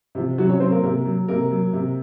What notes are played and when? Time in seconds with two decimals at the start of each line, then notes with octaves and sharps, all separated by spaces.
0.15 C3 F3
0.38 C3 F#3 F#4
0.49 C#4 C#5
0.60 F#3 C4 C5
0.72 A#3 A#4
0.83 C3 A#3 A#4
1.06 F#3
1.28 C3 A#3 A#4
1.51 F#3
1.73 C3